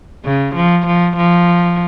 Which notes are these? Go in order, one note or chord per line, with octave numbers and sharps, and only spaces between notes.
C#3
F3
F3
F3